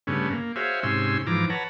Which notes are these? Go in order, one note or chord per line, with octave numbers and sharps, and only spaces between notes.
G2 C#3 A3 B3 C#4
A#3
F#4 G#4 C5 C#5 E5 F5
G#2 C3 C#4 G#5 C6 E6
G#2 E3 F3 A#5 D6
B4 C#5 F#5 A5 A#5